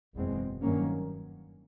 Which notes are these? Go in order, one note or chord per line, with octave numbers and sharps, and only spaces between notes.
F#1 E2 B2 G#3 C4
G2 D#3 F#3 A#3 C#4